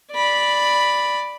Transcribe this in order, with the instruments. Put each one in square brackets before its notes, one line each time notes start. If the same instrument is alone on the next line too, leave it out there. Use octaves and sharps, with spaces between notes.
[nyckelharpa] D5 B5